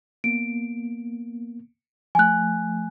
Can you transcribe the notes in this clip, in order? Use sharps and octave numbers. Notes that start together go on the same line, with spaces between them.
A#3 B3 D7
F3 A3 G#5 F#6